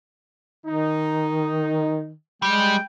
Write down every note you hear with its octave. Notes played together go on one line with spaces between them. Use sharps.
D#3 D#4
G3 G#3 G5